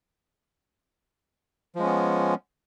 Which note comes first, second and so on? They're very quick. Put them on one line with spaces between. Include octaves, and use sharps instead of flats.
F3 G#3 C#4 B3